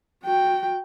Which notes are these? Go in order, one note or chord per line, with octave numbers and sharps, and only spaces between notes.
F#4 G5